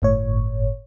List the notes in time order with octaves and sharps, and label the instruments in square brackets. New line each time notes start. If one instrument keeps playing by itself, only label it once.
[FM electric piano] G1 A2 C#5